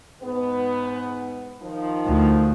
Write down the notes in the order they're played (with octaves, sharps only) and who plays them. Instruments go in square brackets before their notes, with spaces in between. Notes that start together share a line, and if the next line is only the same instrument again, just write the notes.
[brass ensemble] G#2 B3
D#3 F3
[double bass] D2